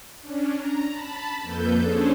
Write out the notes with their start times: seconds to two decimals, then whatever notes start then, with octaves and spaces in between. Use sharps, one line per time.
0.21 C#4 D4
0.57 A#5
0.87 A5 B5
1.41 F2 A#3 A4 B4 G6
1.78 C#4 D4 G#4 A4 C5